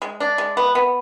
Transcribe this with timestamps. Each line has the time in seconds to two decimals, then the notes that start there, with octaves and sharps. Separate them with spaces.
0.02 G#3
0.20 D4
0.38 G#3
0.57 B3
0.75 B3